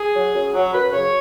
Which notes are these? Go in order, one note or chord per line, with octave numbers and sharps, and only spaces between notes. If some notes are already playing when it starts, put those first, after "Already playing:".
Already playing: G#4
F#3
F#2
F#3
F#2 B4
C#3 F#3 C#5